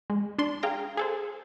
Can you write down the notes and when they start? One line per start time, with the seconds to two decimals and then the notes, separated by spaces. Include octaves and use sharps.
0.10 G#3
0.39 D4 C6
0.63 G#4 F5 G5 A#5
0.97 G#4 A4 C5